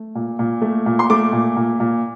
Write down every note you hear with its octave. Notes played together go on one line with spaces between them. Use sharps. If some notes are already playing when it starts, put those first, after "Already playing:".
Already playing: A3
A#2
A#2
A3
A#2
C6
A3 D6
A#2
A#2
A#2